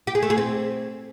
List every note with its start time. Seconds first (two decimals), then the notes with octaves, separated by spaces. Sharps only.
0.07 G4
0.15 G#4
0.23 A3
0.30 G#4
0.38 C4